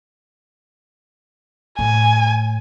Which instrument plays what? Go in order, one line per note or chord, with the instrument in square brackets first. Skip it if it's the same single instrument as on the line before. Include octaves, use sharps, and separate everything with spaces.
[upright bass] A2 [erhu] G#5